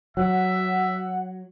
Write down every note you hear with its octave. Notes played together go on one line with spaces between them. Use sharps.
F#3 E5 F#5